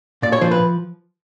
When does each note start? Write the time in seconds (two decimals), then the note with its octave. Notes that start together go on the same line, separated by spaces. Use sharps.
0.22 A#2 D5
0.33 C#5
0.41 F3 C5
0.51 B4